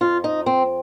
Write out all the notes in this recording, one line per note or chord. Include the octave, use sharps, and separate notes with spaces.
F2 F3 F4
D#4
C4